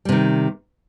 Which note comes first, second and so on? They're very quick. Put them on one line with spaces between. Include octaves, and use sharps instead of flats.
G3 C3 D#3